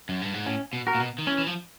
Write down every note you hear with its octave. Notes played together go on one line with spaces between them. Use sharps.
F#2
G2
G#2
A2 C#4
B2
F#4 A#4
A#2
B2
D#3
E3 C#4
E3
F3